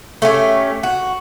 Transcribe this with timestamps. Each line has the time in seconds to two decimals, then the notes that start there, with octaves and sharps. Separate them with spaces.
0.22 A3 C#4 F#4 G4
0.83 F#4